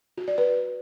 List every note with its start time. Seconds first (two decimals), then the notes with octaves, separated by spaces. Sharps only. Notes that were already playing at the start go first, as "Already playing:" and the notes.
0.18 F#4
0.28 D5
0.38 B4